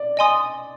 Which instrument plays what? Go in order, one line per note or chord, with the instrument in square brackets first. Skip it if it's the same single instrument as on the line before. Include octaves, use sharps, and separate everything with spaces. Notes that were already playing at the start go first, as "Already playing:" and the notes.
Already playing: [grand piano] D5
[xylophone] D#5 G#5 C6 D#6